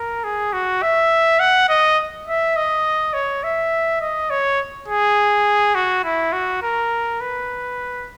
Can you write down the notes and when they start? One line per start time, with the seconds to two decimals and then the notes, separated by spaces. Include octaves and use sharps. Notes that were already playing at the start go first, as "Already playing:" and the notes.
Already playing: A#4
0.24 G#4
0.53 F#4
0.82 E5
1.39 F#5
1.69 D#5
2.27 E5
2.56 D#5
3.13 C#5
3.43 E5
4.01 D#5
4.30 C#5
4.88 G#4
5.75 F#4
6.04 E4
6.32 F#4
6.62 A#4
7.21 B4